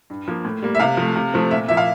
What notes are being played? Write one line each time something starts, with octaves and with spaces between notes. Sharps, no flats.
G2
F3 A#3
A2
G3 A#3
E5
C3 F5
F3 A3
C3
F3 A3 C4
A#2 E5
F3 A#3 E5
F5